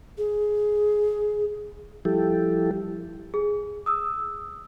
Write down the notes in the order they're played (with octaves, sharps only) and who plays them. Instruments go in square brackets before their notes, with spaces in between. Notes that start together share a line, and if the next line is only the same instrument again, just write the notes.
[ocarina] G#4
[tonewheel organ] F3 G3 E4 G4 A4
[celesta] G#4
D#6 E6